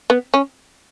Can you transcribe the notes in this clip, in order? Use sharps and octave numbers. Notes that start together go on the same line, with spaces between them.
B3
C#4